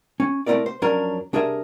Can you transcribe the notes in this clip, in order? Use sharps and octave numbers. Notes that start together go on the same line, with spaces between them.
C#4
A3 C4 D#4 E4 A#4 D5
C5
F2 F#3 C#4 D4 A#4
C2 D4 G#4 A#4 E5